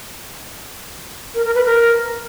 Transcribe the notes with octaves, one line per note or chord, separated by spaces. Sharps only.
A#4
A#4
B4
A#4